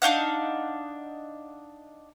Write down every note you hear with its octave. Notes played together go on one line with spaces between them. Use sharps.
D4 D#4 F5 F#5